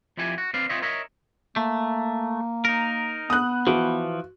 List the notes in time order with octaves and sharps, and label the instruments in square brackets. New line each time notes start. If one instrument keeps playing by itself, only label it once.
[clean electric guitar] F2 F3 E4 G4 G#5
F#4
C4 B4 D5 F5
C4 F4 C5 C#5 D#5 E5
A#4 C#5 D#5 E5
[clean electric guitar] A3 [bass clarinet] A#3
[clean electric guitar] D#4 A#4
[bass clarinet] B3 [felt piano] D#6 F#6
[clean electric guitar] E3 F3 [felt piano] F#4